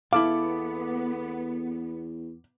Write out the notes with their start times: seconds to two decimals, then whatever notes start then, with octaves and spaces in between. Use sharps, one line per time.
0.13 E2 B3 E4 A4 F5 D6